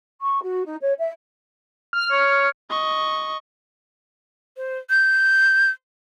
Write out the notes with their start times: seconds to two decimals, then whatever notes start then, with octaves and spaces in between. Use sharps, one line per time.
0.20 C#6
0.42 F#4
0.66 D#4
0.82 C#5
0.99 E5
1.93 F6
2.11 C#5
2.70 D#5 C#6
4.57 C5
4.90 G6